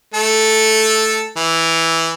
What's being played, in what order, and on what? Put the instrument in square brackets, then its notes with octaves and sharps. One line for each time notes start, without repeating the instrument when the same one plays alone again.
[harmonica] A3 A4
E3